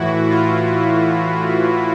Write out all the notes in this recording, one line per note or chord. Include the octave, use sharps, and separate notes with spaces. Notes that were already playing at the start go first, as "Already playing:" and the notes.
Already playing: A2 E3 E4 F#4
F4